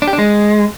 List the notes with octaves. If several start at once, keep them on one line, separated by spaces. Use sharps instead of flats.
D4
G4
D4
G#3